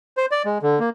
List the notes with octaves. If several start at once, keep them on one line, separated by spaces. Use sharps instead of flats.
C5
D5
G#3
D3
A#3